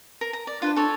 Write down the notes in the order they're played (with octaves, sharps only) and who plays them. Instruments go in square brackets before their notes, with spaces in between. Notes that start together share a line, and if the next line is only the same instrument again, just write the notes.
[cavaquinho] A#4
A#5
D5
[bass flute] D4 [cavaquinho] F4 B4 C5
[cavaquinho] A4 C#5 D5